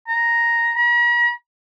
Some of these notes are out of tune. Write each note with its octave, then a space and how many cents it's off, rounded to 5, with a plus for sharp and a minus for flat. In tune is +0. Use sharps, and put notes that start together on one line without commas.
A#5 +0
A#5 +45